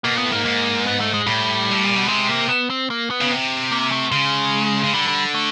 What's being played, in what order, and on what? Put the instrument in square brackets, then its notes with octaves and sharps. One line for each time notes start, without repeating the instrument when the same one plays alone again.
[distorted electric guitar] B2 [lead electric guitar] A#3
[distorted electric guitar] A#2 [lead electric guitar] B3
[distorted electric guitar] A2
[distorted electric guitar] G#2 [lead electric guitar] A#3
[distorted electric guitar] G#2
[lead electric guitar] B3
A3
G#3
[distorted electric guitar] A2 [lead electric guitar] G3
[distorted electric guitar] A2
A#2
B2
[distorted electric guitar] C3 [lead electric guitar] G#3
[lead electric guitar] A#3
B3
C4
A#3
B3
[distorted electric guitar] C#3
C3
[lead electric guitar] A#3
A3
[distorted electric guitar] C#3 [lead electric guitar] G#3
[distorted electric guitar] C#3
[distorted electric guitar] D3 [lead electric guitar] G3
[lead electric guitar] G3
A3